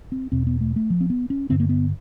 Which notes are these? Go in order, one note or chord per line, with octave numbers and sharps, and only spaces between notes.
C4
E2 B2 C4
B3
A3
A3
F3
C4
B3
C#4
G2 D3 C4
A#3
B3